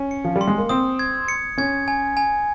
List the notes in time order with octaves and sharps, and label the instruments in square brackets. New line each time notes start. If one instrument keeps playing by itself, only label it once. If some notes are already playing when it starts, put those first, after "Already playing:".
Already playing: [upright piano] C#4
[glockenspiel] C#7
[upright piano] F3
G3
[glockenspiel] C6
[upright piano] G#3
A#3
[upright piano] C4 [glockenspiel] D#6
[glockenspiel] G#6
C#7
[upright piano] C#4 [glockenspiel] G#6
[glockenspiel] G#5
G#5